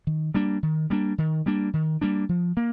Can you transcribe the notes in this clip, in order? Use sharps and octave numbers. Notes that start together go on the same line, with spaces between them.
D#3
G3 A#3 D4
D#3
G3 A#3 D4
D#3
G3 A#3 D4
D#3
G3 A#3 D4
F3
A#3